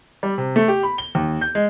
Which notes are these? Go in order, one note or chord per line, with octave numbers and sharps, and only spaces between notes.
G3
C3
A3
G4
B5
G7
D#2
G6
G#3